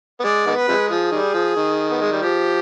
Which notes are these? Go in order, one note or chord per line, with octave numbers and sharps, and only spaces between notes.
B3
G#3 D5
D#3 G#3 B3
B4
C3 F3 G#3
F3 G#4
D#3 G3
F3
D#3
B3
G#3
G3
F3 G4